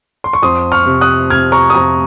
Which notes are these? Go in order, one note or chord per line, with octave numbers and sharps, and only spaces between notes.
C6
C#6
F2 C6 D#6
C#6 F6
C3
D#6 F#6
C3 F6 G#6
A#5 C#6
D#6
F2 A#5 C#6